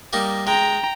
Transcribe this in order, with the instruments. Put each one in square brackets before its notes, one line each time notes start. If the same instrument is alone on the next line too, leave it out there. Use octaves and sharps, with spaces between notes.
[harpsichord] G3 A#3 D#4
[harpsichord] G#3 [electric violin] G5 A#5